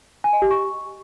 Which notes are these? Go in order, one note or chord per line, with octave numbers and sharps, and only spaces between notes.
G#5
D#5
G4
C#6